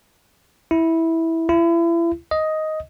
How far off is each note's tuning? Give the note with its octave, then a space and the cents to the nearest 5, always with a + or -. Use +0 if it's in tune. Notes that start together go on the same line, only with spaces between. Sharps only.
E4 -10
E4 +35
D#5 +5